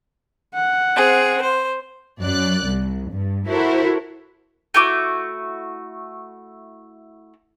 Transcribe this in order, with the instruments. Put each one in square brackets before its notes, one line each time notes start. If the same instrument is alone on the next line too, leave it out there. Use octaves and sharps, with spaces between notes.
[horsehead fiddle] F#5
[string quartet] C4 G#4
C5
[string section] F#2 D5 F#6
C2
G2
E4 F#4 A4 A#4 C5
[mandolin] A3 E4 F#4 D6